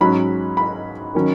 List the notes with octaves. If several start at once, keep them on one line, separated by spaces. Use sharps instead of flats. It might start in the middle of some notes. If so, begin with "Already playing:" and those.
G#2 F#3 C#4 B5
B5
D#3 F#3 C#4